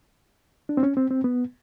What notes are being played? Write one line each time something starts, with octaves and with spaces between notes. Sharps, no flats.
D4
C4
C#4
C4
C4
B3